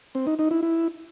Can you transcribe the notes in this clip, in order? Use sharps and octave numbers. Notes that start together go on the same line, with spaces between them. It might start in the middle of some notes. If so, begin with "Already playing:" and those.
C4
D#4
D#4
E4
E4